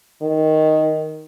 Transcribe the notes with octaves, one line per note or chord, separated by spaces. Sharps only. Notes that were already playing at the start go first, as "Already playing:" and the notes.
D#3